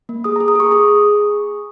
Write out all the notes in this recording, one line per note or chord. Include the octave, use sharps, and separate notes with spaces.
A#3
G#4 D#6
A#5
G#4
D#6
G#4 C#6
G#4 D#6